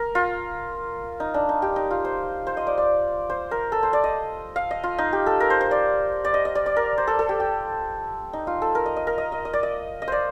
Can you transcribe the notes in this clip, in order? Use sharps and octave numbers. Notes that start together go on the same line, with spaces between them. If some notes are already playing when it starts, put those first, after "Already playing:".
Already playing: A#4
F4
D#4
D4
D#4
G4
D#4
F4
C5
C5
D#5
D5
D5
C5
A#4
A4
C5
D5
D#5
F5
D#5
F4
D#4
G4
A4
A#4
C5
C5
D5
D5
D#5
D#5
D5
D5
A#4
C5
A4
A4
G4
G4
D#4
F4
A4
A#4
D#5
D#5
A#4
D#5
D#5
D#5
D5
D#5
D#5
C5 D5